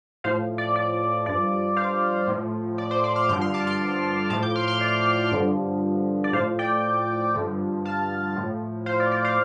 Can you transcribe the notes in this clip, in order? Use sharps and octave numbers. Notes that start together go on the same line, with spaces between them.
A2 F3 C5 F5
D5
D5
G2 F3 D5
C5 F5
A2 F3
D5
C5
D5
C6 F6
G2 D3 F3 D6 G6
C6 F6
A5 D6
C6 F6
A2 F3 A5 D6
D6 G6
C6 F6
C6 F6
D5
G2 D3 F3
D5
A2 F3 C5 F5
D5 G5
G2 D3 F3
F5 A5
A2 F3
C5 F5
D5
D5
C5 F5